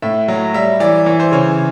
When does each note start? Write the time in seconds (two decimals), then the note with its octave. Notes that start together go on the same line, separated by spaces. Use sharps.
0.02 A2 E5
0.28 F#3
0.54 G3 E5
0.80 E3 D5
1.06 E3 C#5
1.20 C5
1.32 C#3 C#5